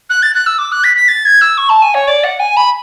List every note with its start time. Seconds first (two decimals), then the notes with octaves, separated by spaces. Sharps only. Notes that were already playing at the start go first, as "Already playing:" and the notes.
0.10 F#6
0.23 A6
0.34 F#6
0.46 E6
0.59 D6
0.72 F#6
0.84 B6
0.96 B6
1.08 A6
1.25 G#6
1.41 E6
1.58 C#6
1.69 A5
1.82 G#5
1.94 C#5
2.08 D5
2.24 F#5
2.40 G#5
2.57 B5